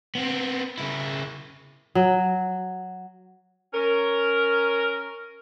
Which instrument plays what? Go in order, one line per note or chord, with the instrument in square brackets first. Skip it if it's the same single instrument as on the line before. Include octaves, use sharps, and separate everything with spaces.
[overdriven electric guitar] B3 C4
C#3 E4
[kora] F#3
[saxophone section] C#4 A#4